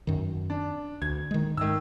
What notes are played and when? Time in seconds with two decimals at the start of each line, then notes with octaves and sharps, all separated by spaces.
0.07 F#2 D#3
0.50 D4
1.02 D2 G#6
1.31 D#3 G#3
1.57 G#2 D#3 G#3 E6